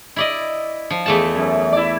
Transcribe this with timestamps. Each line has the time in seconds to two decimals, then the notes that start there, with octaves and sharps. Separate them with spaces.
0.16 E4 D5 D#5
0.90 F3
1.06 E2 A3 A5
1.35 F#2
1.72 E4 D5